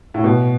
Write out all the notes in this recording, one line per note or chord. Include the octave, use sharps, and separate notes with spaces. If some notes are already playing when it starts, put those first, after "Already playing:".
A2
B2